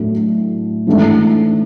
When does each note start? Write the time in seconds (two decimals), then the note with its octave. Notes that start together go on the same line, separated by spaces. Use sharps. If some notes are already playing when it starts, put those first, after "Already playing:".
Already playing: A2 F#3 A3 D4
0.87 G#2 E3 A3 D4